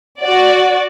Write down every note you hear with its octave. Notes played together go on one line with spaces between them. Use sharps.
F#4 D5